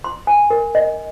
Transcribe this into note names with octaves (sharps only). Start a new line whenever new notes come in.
C6
G#5
A#4
D#5